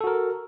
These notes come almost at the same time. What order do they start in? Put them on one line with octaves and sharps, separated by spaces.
A4 F#4 A#4